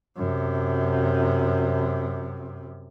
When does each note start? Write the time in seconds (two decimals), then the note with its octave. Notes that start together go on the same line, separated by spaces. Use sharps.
0.17 F#2 C3